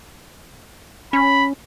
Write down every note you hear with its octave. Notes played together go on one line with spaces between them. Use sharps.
C#4 B5